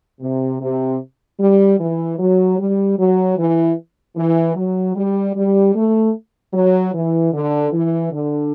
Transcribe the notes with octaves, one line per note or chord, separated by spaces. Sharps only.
C3
C3
G3
E3
F#3
G3
F#3
E3
E3
F#3
G3
G3
A3
F#3
E3
D3
E3
D3